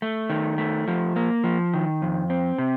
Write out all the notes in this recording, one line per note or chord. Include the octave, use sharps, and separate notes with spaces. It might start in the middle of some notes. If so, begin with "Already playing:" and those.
A3
D#3
A3
F3
A#3
F3
D#3
F2
C4
C3